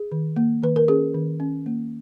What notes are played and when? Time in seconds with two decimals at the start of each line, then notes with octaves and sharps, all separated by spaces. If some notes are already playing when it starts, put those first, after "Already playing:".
Already playing: G#4
0.12 D#3
0.36 A#3
0.62 D#3 B4
0.76 A#4
0.88 C#4 G#4
1.14 D#3
1.40 C#4
1.66 A#3